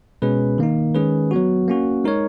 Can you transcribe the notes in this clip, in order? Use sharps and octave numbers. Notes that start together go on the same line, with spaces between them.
B2 G#3 C#4 G#4 B4
D#3 A#3 D#4
D#3 G#3 C#4 G#4 B4
F#3 B3 F#4
A#3 C#4 F#4
G#3 D#4 A#4 C#5